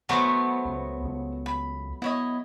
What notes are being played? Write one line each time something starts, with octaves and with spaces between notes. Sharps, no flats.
F#3 A3 B3 F#4 C5 C#6
C#2
C#2
B5
B3 E4 C#5 D#5